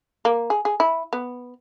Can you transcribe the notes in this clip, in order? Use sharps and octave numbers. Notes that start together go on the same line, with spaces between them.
A#3
G#4
G#4
E4
B3